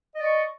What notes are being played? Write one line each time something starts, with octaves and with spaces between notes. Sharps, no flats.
D5 D#5 C#6